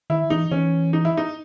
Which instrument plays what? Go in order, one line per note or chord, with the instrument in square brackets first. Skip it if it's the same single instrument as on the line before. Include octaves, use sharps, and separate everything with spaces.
[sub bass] D#3 [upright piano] E4
[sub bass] E3 [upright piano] D#4
[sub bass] E3 [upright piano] C#4
[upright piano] D#4
E4
D#4